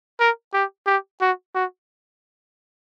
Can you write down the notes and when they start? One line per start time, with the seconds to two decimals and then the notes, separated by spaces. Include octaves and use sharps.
0.20 A#4
0.54 G4
0.87 G4
1.21 F#4
1.55 F#4